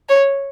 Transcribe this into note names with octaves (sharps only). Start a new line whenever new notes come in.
C#5